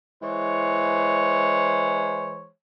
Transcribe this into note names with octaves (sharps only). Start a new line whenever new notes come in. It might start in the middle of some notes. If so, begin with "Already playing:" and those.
E3 G#3 C5 C#5